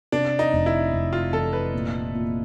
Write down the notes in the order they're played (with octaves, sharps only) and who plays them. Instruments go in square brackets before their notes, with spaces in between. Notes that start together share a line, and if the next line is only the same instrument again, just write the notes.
[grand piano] C3 [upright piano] D4
[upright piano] D#4
[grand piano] F1
[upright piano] E4
[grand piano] F1
[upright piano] F4
[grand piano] E3 [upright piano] A4
[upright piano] B4
[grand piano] A#2
A#2